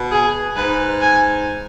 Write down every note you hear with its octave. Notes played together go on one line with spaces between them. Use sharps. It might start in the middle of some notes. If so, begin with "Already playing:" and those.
Already playing: B2
G#4
G#2 B4
G#5